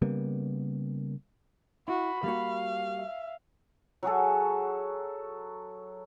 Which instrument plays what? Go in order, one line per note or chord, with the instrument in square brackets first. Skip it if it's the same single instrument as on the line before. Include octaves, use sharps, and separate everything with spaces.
[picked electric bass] C#3 G3 A#3 B3
[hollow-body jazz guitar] E4 [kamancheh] F#4 [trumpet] B5
[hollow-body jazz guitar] G3 A#3 F#4 [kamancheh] F5
[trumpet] E5
[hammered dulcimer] F#3 F#4 G#4 A4